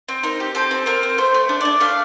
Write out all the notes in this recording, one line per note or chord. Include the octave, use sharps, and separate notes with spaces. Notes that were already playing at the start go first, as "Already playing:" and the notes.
C4
D#4 A#4
G4
C4 A4
C4
C4 A#4
C4
A3 C5
A3
D4
D4 D5
A3 F5